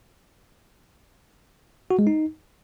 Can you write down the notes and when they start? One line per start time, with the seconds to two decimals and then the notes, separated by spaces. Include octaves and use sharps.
1.91 F#4
1.99 G#3
2.07 D#4